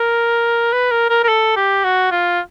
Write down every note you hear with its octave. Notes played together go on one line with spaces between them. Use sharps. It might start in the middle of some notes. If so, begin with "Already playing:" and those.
Already playing: A#4
B4
A#4
A#4
A#4
A4
G4
F#4
F4